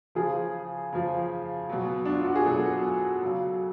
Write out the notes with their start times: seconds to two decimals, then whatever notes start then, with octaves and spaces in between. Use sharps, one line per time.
0.15 C#3 F3 G#4
0.93 C#3 F3
1.70 B2 F#3
2.05 D4
2.14 F4
2.25 F#4
2.35 G#4
2.45 B2 F#3 A4
3.22 C#3 F#3